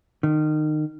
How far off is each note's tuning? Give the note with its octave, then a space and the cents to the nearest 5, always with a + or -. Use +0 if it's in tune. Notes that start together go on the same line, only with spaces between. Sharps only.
D#3 -25